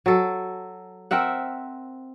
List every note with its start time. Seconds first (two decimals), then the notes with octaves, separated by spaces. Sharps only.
0.06 F#3 A4
1.11 C4 A#4 E5 F#5